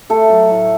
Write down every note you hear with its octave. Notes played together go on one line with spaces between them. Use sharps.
A3 A4
F#3
A2